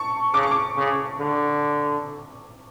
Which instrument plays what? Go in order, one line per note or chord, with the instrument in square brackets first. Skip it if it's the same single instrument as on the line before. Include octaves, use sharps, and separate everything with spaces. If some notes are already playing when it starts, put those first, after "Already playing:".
Already playing: [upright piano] A5 C#6
[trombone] C#3 [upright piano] D6
[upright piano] C#6
D6
[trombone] C#3
D3